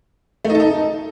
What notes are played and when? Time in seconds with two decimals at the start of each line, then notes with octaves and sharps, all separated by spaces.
0.45 A3
0.50 D#4
0.55 A4
0.60 D#4